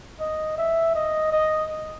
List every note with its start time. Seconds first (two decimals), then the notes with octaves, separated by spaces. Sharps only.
0.20 D#5
0.58 E5
0.95 D#5
1.33 D#5